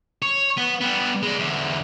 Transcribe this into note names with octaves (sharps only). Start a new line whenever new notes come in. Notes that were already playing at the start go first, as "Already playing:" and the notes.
C#5
B3
G3 B3
G#3 D5
E2 D3